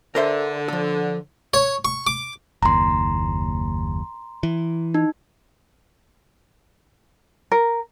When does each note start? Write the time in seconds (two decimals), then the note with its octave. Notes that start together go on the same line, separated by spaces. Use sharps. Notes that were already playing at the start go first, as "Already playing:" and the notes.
0.15 D3 A#4 C5 E5
0.68 F3 A4
1.54 C#5
1.85 C#6
2.07 D6
2.63 F#1 D#2 A#5 C6
4.43 E3
4.94 D#4
7.52 A#4